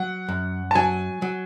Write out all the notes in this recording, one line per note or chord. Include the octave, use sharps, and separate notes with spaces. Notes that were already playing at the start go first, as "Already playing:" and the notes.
Already playing: F#3 F#5
F#2
A5
F#3 G#5
F#3